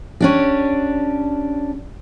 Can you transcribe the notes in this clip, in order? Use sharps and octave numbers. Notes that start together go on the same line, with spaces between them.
C#4 D4 G4